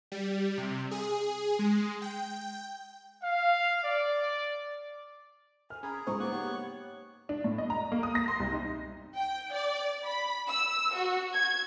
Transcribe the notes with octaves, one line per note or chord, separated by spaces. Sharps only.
G3
C3
G#4
G#3
G5
F5
D5
G#5 F6
C#4 G#4 A#5 B5 G#6
C#2 G#2 C5 A#5 C#6 D#6
A#3 B3 D#4 C#6 D6 F#6
G4 C#5
D4
A2
D#5
A#5
A#3
D#6
A#6
C6
C2
D#4
G5
D5
B5
E6
F#4
G#6